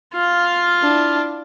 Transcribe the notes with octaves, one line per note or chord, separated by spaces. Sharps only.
F4 F5
D4 E4